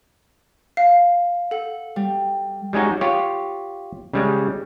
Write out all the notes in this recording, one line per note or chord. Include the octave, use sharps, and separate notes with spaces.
F5
A4 F#5
G3
G3 G#3 C#4 D#4 F#4
F4 G4 C#5
C#3 G3 G#3